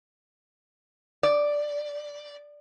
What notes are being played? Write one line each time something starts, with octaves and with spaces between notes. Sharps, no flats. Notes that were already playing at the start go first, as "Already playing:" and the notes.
D5